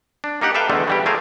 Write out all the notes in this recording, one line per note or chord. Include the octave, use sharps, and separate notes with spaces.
D4
A#3 D#4 G4 F#5
A4 B4 E5 F5 G5
E2 D3 G#3 A3
E3 G3 G4
A3 G#4 A#4 C5 F5